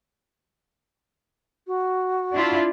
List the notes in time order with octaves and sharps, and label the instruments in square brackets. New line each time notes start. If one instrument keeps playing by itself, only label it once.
[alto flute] F#4
[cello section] D4 E4 F4